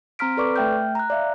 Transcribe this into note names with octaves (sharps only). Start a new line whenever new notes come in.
C4 A#5 C6 F6 B6 D7
A4 B4 D5 C#6 D6
A3 E5 G5 F6 G6
A#5 F#6
D5 E5 F5